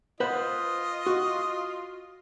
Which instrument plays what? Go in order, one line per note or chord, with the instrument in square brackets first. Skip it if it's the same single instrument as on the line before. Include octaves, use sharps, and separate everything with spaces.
[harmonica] F4 D#5 [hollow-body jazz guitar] B4 C5 F#5
[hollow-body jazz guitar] F#4